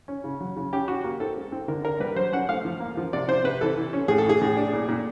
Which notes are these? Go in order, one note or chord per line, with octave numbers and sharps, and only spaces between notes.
C#4
C#3
F#3
C#3
C#4 G4
C#4 F#4
A#3
C4 A4
G#3
C4
D3 A#4
D4 A#4
G3 B4
F#3 C5
C#4 F#5
A3 F5
F3
A#3
F3
C3 D5
C3 C5
C3 B4
E3 A4
E3
C#4
A2 G#4
A4
E3 G#4
A2
D4
A#2
A#2